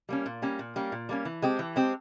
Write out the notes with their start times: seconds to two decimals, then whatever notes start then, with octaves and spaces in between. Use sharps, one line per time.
0.09 G3 A#3 C#4
0.26 A#2
0.42 G3 A#3 C#4
0.59 A#2
0.76 G3 A#3 C#4
0.92 A#2
1.09 G3 A#3 C#4
1.25 E3
1.42 G#3 C4 G4
1.59 E3
1.76 G#3 C4 G4